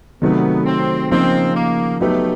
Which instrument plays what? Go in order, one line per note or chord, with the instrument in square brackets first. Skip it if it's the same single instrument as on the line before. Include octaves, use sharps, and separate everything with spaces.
[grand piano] C3 D#3 F#3 A3 [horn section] B3
[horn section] C4
[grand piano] C#3 F3 A#3 D#4 [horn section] C4
[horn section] A#3
[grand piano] F#3 B3 D#4 G4 B4 [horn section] A3